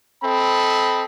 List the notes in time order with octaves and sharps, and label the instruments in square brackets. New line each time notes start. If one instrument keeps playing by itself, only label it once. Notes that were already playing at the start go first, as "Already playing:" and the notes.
[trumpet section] C4 A4 D#5 B5